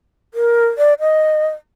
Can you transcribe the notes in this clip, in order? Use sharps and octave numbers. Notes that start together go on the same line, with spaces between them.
A#4
D5
D#5